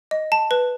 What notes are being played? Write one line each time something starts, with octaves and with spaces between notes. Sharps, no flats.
D#5
A5
B4